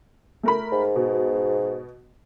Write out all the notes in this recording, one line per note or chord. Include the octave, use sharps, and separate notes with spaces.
A3 A#4 B5
G#2
B2